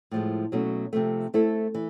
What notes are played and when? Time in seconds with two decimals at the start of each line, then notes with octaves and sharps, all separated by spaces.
0.11 A2 F3 G#3
0.52 B2 F#3 A3 C#4
0.93 C3 F3 A3
1.34 A3 C4 E4 A4
1.74 E3